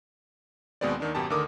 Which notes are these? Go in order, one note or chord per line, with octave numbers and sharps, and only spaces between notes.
D#2 B2 G#3 B3 C4 D5
D#2 D#3 D4
G#1 F#2 B2 G4 A5
D2 D3 D#3 A#4 D6 D#6